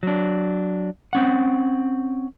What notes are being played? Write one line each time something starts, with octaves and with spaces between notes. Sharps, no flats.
F#3 D4
C4 C#4 F#5